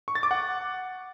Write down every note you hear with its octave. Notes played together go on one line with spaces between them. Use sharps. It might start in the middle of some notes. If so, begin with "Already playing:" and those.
C#6
A6
D6
F#5